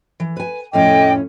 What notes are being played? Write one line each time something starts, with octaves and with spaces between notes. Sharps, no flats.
E3
B4 G#5
F2 A2 C#4 D#5 G5 D6